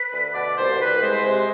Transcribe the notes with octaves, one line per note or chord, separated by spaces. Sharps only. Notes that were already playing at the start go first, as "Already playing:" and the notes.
Already playing: B4
D2
B2 D5
C2 C5
C2 B4
G#3 C5
C3 C5